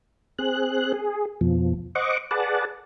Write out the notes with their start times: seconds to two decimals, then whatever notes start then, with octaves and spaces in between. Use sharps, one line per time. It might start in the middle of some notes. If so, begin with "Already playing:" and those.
0.39 C4 G#4 F#6
0.94 G#4
1.41 F2 B2 F3
1.95 C5 D#5 F#5 C#6 D6
2.31 G#4 B4 D5 F#5 A5